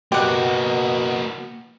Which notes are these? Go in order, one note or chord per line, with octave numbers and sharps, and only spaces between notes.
B2 A#3 F#4 G4 F#5